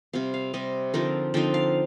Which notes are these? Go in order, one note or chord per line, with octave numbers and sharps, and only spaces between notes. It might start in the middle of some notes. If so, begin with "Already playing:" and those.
C3 G3 C4 F5
F5
C3 G3 C4 D#5
D3 F3 C4 D#4 A#4
D3 F3 C4 D#4 G5
F5